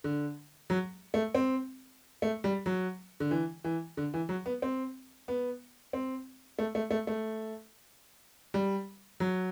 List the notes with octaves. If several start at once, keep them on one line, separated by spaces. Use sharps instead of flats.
D3
F#3
A3
C4
A3
G3
F#3
D3
E3
E3
D3
E3
F#3
B3
C4
B3
C4
A3
A3
A3
A3
G3
F#3